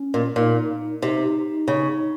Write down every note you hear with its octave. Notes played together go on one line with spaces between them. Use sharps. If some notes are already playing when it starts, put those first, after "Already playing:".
Already playing: C#4
A#2
A#2 D#4
C3 D#4
C#3